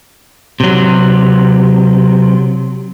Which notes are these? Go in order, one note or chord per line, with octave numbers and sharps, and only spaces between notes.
C3 F#3